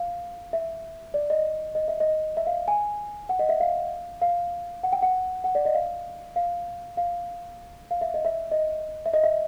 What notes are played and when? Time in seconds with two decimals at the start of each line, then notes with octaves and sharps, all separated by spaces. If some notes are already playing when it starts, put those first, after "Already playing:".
Already playing: F5
0.53 E5
1.14 D5
1.30 D#5
1.75 D#5
1.88 E5
2.00 D#5
2.37 E5
2.47 F5
2.68 G#5
3.29 F#5
3.39 D#5
3.49 E5
3.60 F5
4.21 F5
4.83 F#5
4.93 G5
5.02 F#5
5.44 F#5
5.55 D5
5.65 D#5
5.74 F5
6.36 F5
6.97 F5
7.91 F5
8.01 E5
8.14 D#5
8.25 E5
8.52 D#5
9.06 E5
9.14 D#5
9.24 E5